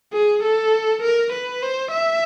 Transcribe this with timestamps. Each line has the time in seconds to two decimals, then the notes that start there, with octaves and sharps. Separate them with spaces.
0.13 G#4
0.44 A4
1.02 A#4
1.33 B4
1.62 C5
1.91 E5